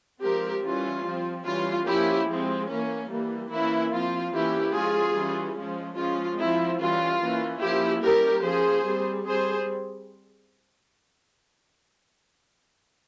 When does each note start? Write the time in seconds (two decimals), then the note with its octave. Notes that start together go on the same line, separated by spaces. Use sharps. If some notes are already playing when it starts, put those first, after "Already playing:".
0.22 F3 G#3 C4 G4 A#4
0.63 E3 G3 C#4 F4
1.05 F3 C4
1.45 E3 G3 C#4 F4
1.87 F3 A#3 C#4 E4 G4
2.28 F3 G#3 C4
2.69 E3 A#3 C#4
3.10 E3 G3 A#3
3.51 E3 A#3 C#4 E4
3.92 F3 C4 F4
4.33 E3 A#3 C#4 E4 G4
4.74 F3 G#3 C#4 F4 G#4
5.15 E3 G3 C#4
5.57 F3 G#3 C#4
5.97 F3 G#3 C#4 F4
6.39 F3 C4 E4
6.80 E3 G3 C#4 F4
7.22 E3 A#3 C#4
7.61 F3 A#3 C#4 E4 G4
8.02 G3 C#4 G4 A#4
8.44 F3 A#3 C#4 G#4 C5
8.86 G3 C4
9.26 G3 C4 G#4 C5